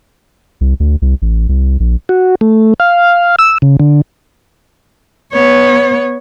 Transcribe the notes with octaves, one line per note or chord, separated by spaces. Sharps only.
C2
D2
C2
A1
C2
A#1
F#4
A3
F5
E6
C#3
D3
B3 C#5